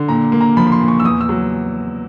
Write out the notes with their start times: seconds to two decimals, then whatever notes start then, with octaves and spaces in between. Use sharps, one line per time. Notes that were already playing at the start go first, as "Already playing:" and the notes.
Already playing: D3
0.09 A#2 A#5
0.32 A#3
0.41 A#5
0.57 F3 B5
0.67 B5
0.72 C6
0.81 A#2
0.88 C#6
1.00 E6
1.05 E2 D#6
1.21 E6
1.29 F#3